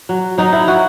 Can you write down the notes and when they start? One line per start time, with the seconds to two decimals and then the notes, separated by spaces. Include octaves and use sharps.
0.09 F#3
0.38 F#3 D#4
0.53 E4
0.67 F#3 F#4